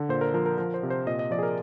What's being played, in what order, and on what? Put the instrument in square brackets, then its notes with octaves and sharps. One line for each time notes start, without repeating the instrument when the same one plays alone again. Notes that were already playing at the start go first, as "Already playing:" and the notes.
Already playing: [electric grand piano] D3
A#2 C5
A#4
F3 A#4
A#4
F3 A#4
C5
C3
C5
A#2 D#5
D#5
F3 D5
G#4
A#4